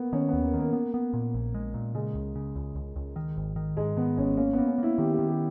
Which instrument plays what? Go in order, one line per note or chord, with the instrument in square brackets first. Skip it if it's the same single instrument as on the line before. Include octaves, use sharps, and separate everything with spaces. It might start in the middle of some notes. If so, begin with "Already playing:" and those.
Already playing: [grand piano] A#3 B3
[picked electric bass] D#3 [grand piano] C#4
[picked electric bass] D#2 [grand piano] B3
[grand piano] A#3
[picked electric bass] D#3
[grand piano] A#3
[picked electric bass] B3
B3
A#2
A#1
G#3
A#2
[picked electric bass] C#3 [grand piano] G#3
[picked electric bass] C#2
C#3
C#2
C#2
C#2
D#3
G#1
D#3
[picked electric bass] G#2 [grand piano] G#3
[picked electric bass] D#3 [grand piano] B3
[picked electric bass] G#1 [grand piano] C#4
[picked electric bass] A#3 [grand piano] C#4
[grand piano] B3
[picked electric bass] A#3
[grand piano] C#4
[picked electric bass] A#3 [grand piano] E4
[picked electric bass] D#3 [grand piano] G4
[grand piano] G4
[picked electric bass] D#3
[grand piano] G4